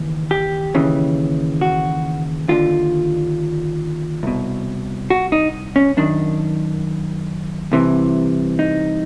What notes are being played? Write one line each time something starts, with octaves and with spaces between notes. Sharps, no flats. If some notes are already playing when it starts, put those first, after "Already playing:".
Already playing: D#2 C#3 E3
G4
D#2 C#3 E3
F#4
D#2 D3 F4
C2 B2
F#4
D#4
C#4
F#2 D#3 D4
C2 C3 E3
D#4